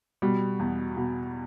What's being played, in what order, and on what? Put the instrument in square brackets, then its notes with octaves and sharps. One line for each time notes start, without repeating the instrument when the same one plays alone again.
[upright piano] B2 G3
E2
B2